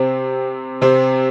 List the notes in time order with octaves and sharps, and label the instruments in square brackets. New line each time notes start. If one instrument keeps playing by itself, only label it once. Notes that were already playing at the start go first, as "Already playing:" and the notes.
Already playing: [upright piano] C3 C4 [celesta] G4 C5
[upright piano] C3 C4